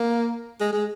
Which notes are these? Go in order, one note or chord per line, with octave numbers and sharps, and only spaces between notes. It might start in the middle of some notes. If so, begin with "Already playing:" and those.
Already playing: A#3
G#3
G#3